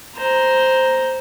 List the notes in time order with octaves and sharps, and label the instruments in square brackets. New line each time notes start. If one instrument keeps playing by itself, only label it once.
[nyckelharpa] C5 A#5